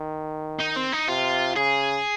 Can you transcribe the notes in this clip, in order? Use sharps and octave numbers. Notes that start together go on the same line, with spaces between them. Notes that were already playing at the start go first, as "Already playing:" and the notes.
Already playing: D#3
D#4
C4
D#4
C3 F4
C#3 G#4